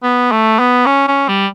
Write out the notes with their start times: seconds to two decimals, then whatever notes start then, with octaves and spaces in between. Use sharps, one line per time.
0.03 B3
0.32 A3
0.59 B3
0.86 C#4
1.08 C#4
1.28 G3